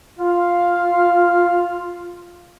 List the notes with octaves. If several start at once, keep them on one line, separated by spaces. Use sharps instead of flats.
F4 F5